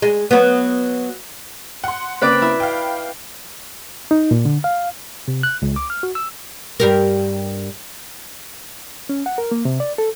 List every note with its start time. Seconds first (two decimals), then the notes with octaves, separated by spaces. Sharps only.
0.02 G#3
0.31 F#3 B3
1.84 F#5 C6
2.21 C#3 A#3 C4 B4 D5
2.42 E4
2.60 F5 G5
4.11 D#4
4.31 A#2
4.45 D3
4.64 F5
5.28 C3
5.43 F#6
5.62 C#2
5.76 D6
5.90 F6
6.03 F#4
6.15 E6
6.80 G2 G4 A#4
9.09 C#4
9.26 F#5
9.38 A#4
9.51 A#3
9.65 C3
9.80 D5
9.98 A4